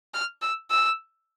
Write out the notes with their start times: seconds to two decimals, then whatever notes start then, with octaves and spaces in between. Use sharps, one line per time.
0.14 F6
0.41 E6
0.71 E6